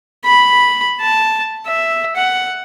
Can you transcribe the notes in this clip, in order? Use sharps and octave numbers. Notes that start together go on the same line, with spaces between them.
B5
A5
E5
F#5